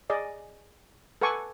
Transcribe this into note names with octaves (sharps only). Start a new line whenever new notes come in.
G#4 D5 D#5
A4 B4 F#5 G#5 C#6 D6